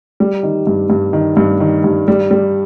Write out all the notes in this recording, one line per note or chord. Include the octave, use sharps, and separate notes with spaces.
G3
D#3
G2
G2
D#3
G2
D#3
G2
G3
G3